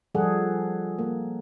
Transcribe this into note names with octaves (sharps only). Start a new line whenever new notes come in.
F3 G3 G#4 A4 F#5
A#3